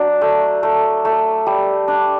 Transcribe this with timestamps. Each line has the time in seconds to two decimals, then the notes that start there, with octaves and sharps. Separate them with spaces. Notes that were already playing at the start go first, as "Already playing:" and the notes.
Already playing: F#3 D4 D5
0.21 A3
0.63 A3
1.05 A3
1.47 G3
1.88 D4